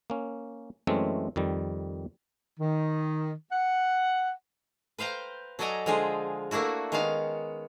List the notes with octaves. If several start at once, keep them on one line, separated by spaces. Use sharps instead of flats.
A#3 C#4
F#2 E3 G#3 A3 C4 C#4
F2 D#3 G3
D#3
F#5
B4 C5 F5 G5 A#5
F#3 A4 D5 D#5 G#5 A#5
D3 F3 G#3 F4 G#4
A3 A#3 D4 E4 F#4
D#3 G#3 B3 C#4 F5